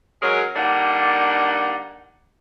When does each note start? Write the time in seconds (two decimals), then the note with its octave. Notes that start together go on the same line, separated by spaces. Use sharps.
0.22 F#3 G#3 C#4 G#4 A#4
0.56 D3 G3 A#3 D4 D#4 F#5